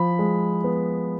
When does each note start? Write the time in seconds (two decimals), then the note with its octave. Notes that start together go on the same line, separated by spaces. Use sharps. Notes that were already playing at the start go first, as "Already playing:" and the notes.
Already playing: F3 B5
0.19 G#3
0.64 B3